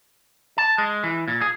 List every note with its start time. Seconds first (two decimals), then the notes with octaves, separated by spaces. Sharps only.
0.58 A5
0.78 G#3
1.04 E3
1.28 A#2
1.41 G#4